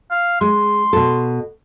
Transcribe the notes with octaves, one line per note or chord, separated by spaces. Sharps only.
F5
G#3 C6
B2 A4